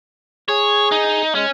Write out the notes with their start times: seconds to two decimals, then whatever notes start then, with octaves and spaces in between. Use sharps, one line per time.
0.49 G#4 C#5
0.92 D#4
1.35 G#3 C#4